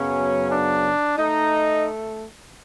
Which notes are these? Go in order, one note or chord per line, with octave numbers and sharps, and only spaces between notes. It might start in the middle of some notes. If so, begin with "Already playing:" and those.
Already playing: F#2 C#3 F#3 B3 C#4
D4
A3 D#4